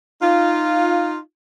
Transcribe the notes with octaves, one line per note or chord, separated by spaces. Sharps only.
D#4 F4